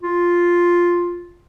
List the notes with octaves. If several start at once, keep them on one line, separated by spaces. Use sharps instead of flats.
F4